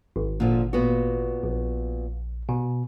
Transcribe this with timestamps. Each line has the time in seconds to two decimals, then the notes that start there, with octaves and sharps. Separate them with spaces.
0.16 G#1
0.40 A#2 D3 F3
0.73 A#2 B3 F#4
1.44 A#1
2.49 B2